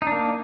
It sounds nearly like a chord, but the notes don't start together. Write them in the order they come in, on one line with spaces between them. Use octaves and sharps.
D#4 D4 A#3